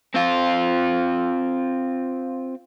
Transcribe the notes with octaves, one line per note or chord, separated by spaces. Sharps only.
C4 F4